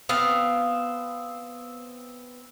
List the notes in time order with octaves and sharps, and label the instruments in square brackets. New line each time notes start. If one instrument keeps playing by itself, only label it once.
[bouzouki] B3 C4 F5